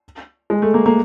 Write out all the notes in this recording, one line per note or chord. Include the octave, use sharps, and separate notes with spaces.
G#3
A3
A#3
A#3